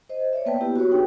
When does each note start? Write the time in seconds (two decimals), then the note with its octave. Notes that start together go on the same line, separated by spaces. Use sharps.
0.09 C5 D#5
0.33 C#5 D5 E5
0.46 A#3 B3 B4 G5 A5
0.61 B3 E4 G4
0.76 F#4 G4 B4 C#5
0.91 D4 D#4 G#4 G5